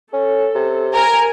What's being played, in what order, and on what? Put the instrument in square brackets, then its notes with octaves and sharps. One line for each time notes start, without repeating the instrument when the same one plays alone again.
[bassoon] C#4 [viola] A4
[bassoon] C3
[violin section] A#4 [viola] G#5